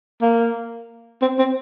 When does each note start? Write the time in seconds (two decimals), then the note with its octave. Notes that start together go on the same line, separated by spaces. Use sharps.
0.22 A#3
1.22 C4
1.39 C4